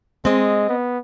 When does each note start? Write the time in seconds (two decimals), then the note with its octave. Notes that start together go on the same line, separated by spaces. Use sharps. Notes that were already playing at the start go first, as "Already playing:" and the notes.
0.25 G#3 C4 D#5
0.69 B3